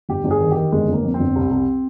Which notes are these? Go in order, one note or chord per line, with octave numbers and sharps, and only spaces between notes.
G1 G4
G1
G#4
D#3
D#3 G4
G1 G#3
G1 A#3
F2
C4
G1
C2
C2